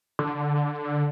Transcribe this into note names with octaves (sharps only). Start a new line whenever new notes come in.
D3